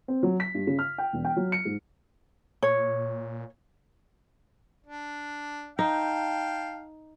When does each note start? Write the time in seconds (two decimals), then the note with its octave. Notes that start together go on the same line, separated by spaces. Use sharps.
0.08 C4
0.23 F#3
0.40 B6
0.55 G2
0.67 C#3
0.79 F6
0.98 G5
1.13 E1
1.25 G5
1.36 F#3
1.52 C#7
1.65 G#2
2.63 A#2 C#5
4.86 D4
5.79 D#4 F5 G5 A5